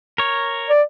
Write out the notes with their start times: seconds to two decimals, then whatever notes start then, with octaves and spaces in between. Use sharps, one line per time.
0.18 A#4 C#5
0.70 D5